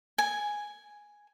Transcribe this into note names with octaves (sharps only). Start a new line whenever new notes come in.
G#5